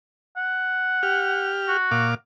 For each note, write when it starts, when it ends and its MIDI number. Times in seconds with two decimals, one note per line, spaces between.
0.37 1.53 78
1.03 1.77 67
1.03 1.77 89
1.68 2.09 66
1.91 2.15 46
1.91 2.15 77
1.91 2.15 86